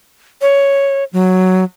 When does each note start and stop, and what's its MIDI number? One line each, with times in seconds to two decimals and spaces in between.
0.41 1.04 73
1.13 1.64 54